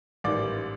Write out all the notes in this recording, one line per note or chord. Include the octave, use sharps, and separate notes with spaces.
A1 G#2 D#3 G3 D5 D6